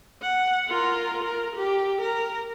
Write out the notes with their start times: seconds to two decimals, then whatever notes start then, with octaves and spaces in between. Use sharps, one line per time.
0.22 F#5
0.68 F4 A#4
1.24 A#4
1.56 G4
2.01 A#4